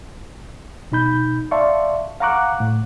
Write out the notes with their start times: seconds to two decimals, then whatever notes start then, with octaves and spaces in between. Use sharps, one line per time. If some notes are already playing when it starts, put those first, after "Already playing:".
0.92 B2 D#4 B5 G6
1.51 D5 E5 F5 A5 C6 C#6
2.20 F5 F#5 A#5 C#6 D6 F#6
2.60 A2